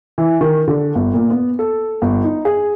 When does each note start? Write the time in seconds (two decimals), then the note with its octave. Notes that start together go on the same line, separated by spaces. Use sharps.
0.18 E3
0.41 D#3
0.68 D3
0.95 G1
1.14 A#2
1.30 B3
1.59 A4
2.02 G1
2.24 D#4
2.45 G#4